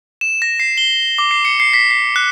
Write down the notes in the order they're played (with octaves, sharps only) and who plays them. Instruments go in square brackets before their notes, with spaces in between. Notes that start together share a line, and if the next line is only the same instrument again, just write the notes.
[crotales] E7
A#6
C7
G7
D6
C7
C#7
C7
B6
C7
F#6